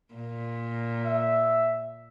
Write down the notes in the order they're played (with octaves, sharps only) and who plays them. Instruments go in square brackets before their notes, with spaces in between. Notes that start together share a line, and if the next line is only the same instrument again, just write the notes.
[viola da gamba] A#2
[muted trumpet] E5